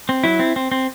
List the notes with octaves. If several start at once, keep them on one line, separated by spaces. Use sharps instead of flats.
C4
F#3 E4
C4
C4
C4